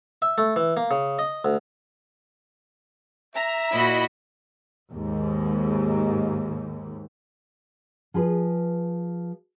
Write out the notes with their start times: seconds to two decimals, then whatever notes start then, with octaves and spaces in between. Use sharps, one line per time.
0.22 E5
0.38 A3
0.56 E3
0.77 A#3
0.91 C#3
1.19 D#5
1.45 D2
3.35 E5 A#5
3.73 A#2 E4 F#4 D#5 B5
4.91 D#2 G#2
8.14 F3 G#4 B4